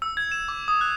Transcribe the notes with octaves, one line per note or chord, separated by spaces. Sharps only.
E6
G#6
E7
D6
D#6
F#6